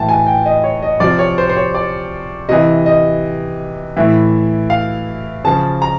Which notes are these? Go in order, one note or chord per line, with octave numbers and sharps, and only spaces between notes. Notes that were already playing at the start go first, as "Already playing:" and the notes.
Already playing: A2 E3 G5 A5
G#5
G5
D#5
C#5
D#5
C3 F3 D5
C#5
C5
C5
C#5
D5
C3 E3 D#5
D#5
A2 E3 E5
F5
C#3 F3 A5
A#5